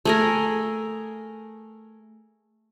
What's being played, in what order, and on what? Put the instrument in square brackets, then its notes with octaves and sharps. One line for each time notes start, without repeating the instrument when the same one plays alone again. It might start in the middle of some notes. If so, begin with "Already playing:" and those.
[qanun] A3 G#4 A#4